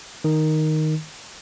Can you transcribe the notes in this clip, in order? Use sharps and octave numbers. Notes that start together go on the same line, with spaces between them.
D#3